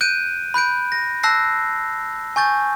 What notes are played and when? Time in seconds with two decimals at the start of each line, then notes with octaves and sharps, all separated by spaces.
0.01 F#6 G6 D7 D#7
0.54 B5 F#6 G6 D7
0.92 A#6
1.23 A5 E6 F#6 A#6 C7
2.36 G#5 C#6 G6 A6